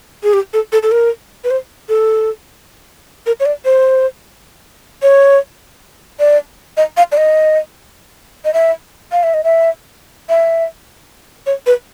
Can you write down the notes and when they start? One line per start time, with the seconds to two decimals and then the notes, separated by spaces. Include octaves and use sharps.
0.23 G#4
0.33 G4
0.53 A4
0.72 A4
0.83 A4
0.92 A#4
1.44 B4
1.51 C5
1.89 A4
3.26 A#4
3.40 C#5
3.46 D5
3.65 C5
5.02 C#5
6.20 D5
6.77 D#5
6.97 F5
7.12 D5
7.17 D#5
8.45 D#5
8.54 E5
9.12 F5
9.23 E5
9.34 D#5
9.44 E5
10.29 E5
11.46 C#5
11.66 B4